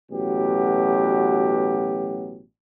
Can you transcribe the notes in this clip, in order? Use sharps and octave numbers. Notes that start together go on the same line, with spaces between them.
A1 B2 F#3 G4